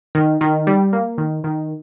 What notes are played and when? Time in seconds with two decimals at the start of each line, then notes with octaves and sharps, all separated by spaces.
0.15 D#3
0.41 D#3
0.67 G3
0.93 A#3
1.18 D#3
1.44 D#3